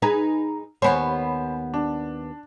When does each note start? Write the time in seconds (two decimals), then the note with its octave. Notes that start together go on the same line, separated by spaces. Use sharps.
0.02 D#4 G#4 B4 A#5
0.82 D#2 B3 C5 C#5 G#5 B5
1.74 D4